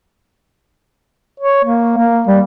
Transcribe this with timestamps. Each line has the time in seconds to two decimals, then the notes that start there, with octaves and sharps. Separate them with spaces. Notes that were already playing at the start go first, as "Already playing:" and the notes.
1.40 C#5
1.65 A#3
1.97 A#3
2.28 G3